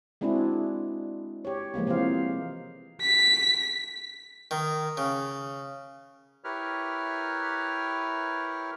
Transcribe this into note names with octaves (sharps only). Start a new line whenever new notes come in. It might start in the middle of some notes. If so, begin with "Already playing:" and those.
G#3 C4 D4 E4 F#4 G#4
G4 C#5
F3 G#3 A#3 B3
C3 E3 F4 G4 C5 F5
B6
D#3
C#3
E4 G4 A#4 B4 C#5 F6